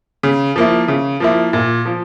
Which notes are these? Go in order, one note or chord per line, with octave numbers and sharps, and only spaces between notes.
C#3
F3 A#3 E4
C#3
F3 A#3 E4
A#2
F3